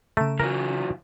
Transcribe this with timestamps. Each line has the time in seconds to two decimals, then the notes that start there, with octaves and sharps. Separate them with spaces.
0.17 C#3 A3 A#5
0.40 E3 F#3 A#4